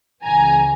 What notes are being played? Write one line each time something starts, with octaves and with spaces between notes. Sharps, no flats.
C#2 C#3 E3 G#5 A#5